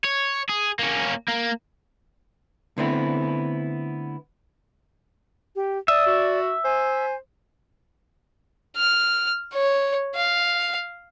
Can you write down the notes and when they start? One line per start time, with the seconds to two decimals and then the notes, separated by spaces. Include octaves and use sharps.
0.05 C#5
0.49 G#4
0.79 A#3 C#4
1.28 A#3
2.78 D3 A3 B3 C4 E4
5.56 G4
5.88 D5 E5 D#6
6.06 F#4
6.64 C5 G#5
8.77 F6
9.53 C#5
10.15 F5